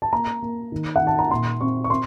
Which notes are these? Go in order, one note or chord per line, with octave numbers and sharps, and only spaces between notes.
A5
A#3 A#5
A#3
D#3
F#5
D#3
A5
A#5
A#2 C6
C4 C#6
C#6
C4 C6